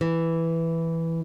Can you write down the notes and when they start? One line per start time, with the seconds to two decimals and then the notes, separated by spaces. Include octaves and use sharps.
0.01 E3